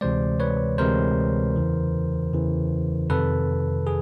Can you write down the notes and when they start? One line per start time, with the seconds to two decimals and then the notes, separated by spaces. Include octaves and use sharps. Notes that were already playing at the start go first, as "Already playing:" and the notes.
0.01 D2 C3 E3 G#3 C5 D5
0.40 B4 C#5
0.78 D2 C3 E3 G#3 A#4 C5
1.56 E2 C#3 E3
2.33 E2 C#3 E3
3.10 F2 C3 D#3 A4 B4
3.87 G#4